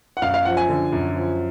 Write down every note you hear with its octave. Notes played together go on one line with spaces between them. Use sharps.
F#5
F#2 F5
F5
F3 F#5
G#5
D3
F#2
F3